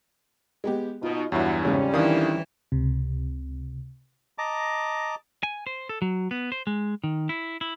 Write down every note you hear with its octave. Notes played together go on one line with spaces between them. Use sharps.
G#3 B3 G4
B2 D#4 F4
E2 G2 F#3 E4
F2 G#2 C#3 G3 C#4 F5
D#3 E3 D4 E4 F5 D#6
C#2 C3
D#5 A5 A#5 D6
G#5
C5
A4
F#3
B3
C5
G#3
D#3
E4
E4